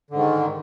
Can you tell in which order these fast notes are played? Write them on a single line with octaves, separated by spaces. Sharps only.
D3 G#2 D#3